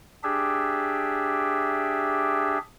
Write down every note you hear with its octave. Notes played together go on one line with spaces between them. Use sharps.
D4 G4 G#4 E5